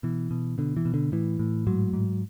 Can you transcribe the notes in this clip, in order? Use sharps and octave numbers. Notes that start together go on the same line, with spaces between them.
B2 E3
B2
B2 D3
E3
B2
D3
A2 E3
A2
G#2 F#3
G#2